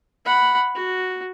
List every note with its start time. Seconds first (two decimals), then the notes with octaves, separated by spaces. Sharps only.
0.25 F#5 B5
0.75 F#4